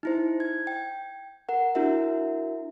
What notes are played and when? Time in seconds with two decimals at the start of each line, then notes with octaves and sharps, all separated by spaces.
0.03 D#4 E4 C5
0.40 G#6
0.67 G5
1.49 A#4 F#5
1.75 D4 E4 F#4 A#4 E5